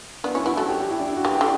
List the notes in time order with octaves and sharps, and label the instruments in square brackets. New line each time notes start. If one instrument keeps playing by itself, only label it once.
[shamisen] B3 [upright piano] D4
[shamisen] C#4 [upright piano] E4
[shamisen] B3 [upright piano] E4
[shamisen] A3 [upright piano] F#4
[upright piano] G4
G4
E4
D4
E4
F#4
[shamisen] E3 [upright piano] G4
[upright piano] G4
[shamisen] D3